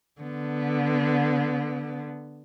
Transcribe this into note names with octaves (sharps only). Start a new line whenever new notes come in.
D3 B3